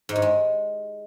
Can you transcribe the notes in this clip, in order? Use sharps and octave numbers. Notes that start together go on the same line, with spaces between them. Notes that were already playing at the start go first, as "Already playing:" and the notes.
G#2
G2
G#3